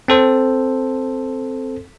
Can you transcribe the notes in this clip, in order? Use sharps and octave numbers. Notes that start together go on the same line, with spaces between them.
C4 A4 C5